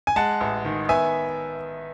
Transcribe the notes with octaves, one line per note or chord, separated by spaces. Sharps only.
G#5
G#3 F#5 A5
A1
D#3
B3 E5 G#5